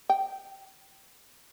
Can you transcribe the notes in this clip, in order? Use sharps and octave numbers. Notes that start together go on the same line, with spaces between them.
G5